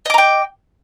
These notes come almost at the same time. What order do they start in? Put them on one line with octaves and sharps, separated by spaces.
D#5 D6 A#5 G5